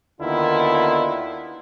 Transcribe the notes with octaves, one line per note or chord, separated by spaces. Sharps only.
D#2 D3 D#3 B3 E4 F4